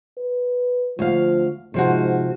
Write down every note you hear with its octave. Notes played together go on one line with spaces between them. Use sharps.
B4
D2 F3 F5
G#2 C3 F3 F#4